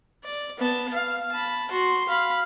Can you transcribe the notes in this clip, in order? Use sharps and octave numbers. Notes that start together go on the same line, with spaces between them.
D5
B3 A5
F5
A5 B5
F#4 C6
F5 B5